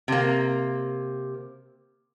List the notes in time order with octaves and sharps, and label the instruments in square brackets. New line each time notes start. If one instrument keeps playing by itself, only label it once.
[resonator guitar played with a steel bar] C3 A#3